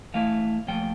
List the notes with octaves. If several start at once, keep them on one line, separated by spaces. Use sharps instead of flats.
E3 A3 E4 F5
A#2 F3 A3 G5